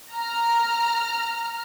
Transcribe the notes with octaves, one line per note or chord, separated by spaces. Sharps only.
A#5 F6